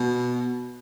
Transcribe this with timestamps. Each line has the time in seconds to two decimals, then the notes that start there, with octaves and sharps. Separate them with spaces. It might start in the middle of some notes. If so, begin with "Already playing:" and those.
Already playing: B2